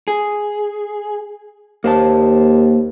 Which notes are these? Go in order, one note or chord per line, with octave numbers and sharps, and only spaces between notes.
G#4
D#2 A#3 C5 A5